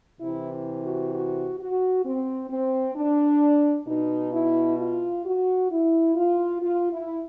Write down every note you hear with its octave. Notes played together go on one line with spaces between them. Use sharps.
C3 E3 E4
F#4
F#4
F#4
C4
C4
D4
B2 D#4
E4
F4
F#4
E4
F4
F4
E4